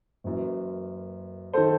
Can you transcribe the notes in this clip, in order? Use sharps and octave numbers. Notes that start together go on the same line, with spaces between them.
F#1 F#2 E3
D#3 A4 C5